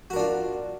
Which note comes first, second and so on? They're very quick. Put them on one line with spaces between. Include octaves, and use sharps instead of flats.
F#4 A#4 D4 F4